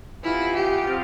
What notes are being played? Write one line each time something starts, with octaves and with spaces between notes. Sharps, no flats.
C3 E3 B3 E4 F4
G4
C3 F3 C4 F4